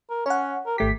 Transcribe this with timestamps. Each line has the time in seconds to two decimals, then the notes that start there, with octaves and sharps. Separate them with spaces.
0.10 A#4
0.26 C#4 C#5 F#5
0.66 A#4
0.78 G#1 A3 G4 B6